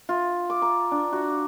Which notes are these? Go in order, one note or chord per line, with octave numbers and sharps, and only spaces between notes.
F4
D6
A#5
D4
F#4